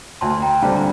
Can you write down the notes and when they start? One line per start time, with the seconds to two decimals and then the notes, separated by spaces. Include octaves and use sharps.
0.21 D2 A5 C6
0.42 G5 A#5
0.62 D3 G3 C4 F5 A5
0.76 A#5